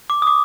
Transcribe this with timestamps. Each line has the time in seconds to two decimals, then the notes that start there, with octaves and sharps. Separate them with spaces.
0.10 D6
0.22 D#6
0.27 D6